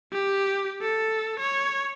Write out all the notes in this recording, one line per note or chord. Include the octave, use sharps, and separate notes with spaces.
G4
A4
C#5